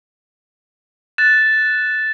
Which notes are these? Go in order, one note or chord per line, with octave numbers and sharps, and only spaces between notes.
F#6 A6 E7